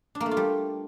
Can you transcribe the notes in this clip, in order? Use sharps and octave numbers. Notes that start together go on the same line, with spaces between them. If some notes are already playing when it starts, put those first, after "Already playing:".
D4
A#3
A3
F4
G3